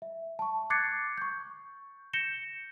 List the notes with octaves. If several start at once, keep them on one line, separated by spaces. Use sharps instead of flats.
E5
A5 C#6
D6 F#6 G#6 A6 C7 C#7
C#6 G6
G6 A#6 C#7 E7 G7